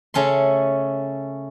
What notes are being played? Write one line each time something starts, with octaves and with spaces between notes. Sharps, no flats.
C#3 A3 C#4 A4 C6